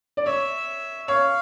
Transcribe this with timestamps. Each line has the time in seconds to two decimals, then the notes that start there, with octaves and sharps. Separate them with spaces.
0.17 D5
0.25 C#5 E5
1.08 C#5 F5